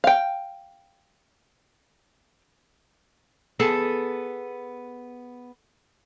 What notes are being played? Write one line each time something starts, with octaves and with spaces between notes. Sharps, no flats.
F5 G5
B3 G#4 A4 A5